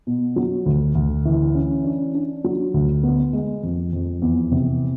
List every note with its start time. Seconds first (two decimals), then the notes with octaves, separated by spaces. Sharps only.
0.07 B2
0.36 F#3
0.66 D2
0.95 D2
1.25 E3
1.55 C#4
1.84 D4
2.14 D4
2.44 F#3
2.74 D2
3.03 B3
3.33 G#3
3.63 F2
3.93 F2
4.22 E2
4.52 C3